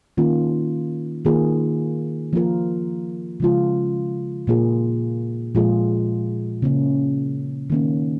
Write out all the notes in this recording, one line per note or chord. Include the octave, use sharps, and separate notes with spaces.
D#3 A#3 C#4 F4
D#3 A#3 F4 G#4
F3 A#3 F4 A#4
C#3 F3 G#3 F4
A#2 A#3 F4 G#4
A#2 F3 G#3 F4 G#4
C#3 A#3 C#4
D#3 A#3 C#4